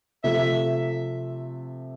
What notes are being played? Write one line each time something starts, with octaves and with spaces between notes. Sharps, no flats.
C3 F3 A3 E5